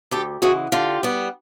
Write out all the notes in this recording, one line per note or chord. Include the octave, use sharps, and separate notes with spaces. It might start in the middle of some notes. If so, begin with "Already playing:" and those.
D2 G4 A4
C#3 E3 G#3 F#4 G#4
D3 F4 G4
G3 B3